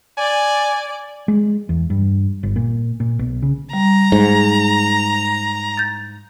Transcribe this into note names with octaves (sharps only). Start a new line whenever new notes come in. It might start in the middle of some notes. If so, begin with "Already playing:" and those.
D5 G#5
G#3
E2
G2
G1
A#2
A#2
B1
C#3
G3 A#5
G#2
G6 A6